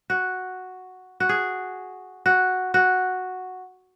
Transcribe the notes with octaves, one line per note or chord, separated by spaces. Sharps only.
F#4
F#4
G#4
F#4
F#4